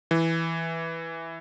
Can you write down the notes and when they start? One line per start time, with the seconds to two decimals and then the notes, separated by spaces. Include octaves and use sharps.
0.11 E3